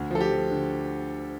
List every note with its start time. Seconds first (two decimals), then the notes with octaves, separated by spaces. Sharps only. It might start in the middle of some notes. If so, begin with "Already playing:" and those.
Already playing: D2
0.11 F3 A4
0.21 G4
0.31 F3
0.51 D3